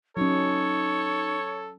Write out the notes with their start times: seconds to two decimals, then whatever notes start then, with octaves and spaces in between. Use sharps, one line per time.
0.17 F#3 C#4 D#4 A4 C#5